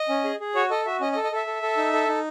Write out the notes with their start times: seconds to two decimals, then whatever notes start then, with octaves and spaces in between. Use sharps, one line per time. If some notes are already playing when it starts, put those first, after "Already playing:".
Already playing: D#5
0.09 C#4
0.24 G#4
0.40 G#4
0.55 F#4 C#5
0.70 A4 D#5
0.86 F#4 E5
1.01 C#4 D#5
1.12 D#5
1.16 A4
1.24 D#5
1.32 A4 E5
1.47 A4
1.62 A4
1.77 D#4
1.93 A4
2.08 D#4